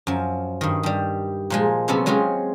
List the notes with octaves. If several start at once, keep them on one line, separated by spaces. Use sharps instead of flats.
F#2 F3
G2 D#3
G2 G3
A#2 F3 G#3
C3 F#3 B3 C#4 A4
F#3 G#3 C4 C#4 F4